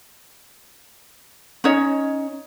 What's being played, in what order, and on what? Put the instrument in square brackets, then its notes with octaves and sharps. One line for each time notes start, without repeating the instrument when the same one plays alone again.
[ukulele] C#4 D#4 C#5 D#5